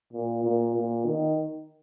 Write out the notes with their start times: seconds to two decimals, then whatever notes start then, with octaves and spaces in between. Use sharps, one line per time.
0.13 A#2
0.43 A#2
0.75 A#2
1.05 D#3